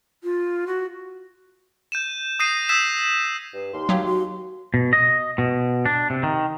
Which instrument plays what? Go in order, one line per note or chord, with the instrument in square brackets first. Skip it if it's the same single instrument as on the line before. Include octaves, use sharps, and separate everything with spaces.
[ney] F4
F#4
[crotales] G6 D#7 E7
D#6 G6 A#6 C7 D#7
D#6 E6 G#6 B6 E7
[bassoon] G2
[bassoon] D#2 [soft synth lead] C6
[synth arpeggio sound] F#3 G4 [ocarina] F5
[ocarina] F#4
[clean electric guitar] B2
D#5
B2
D4
C3
D#3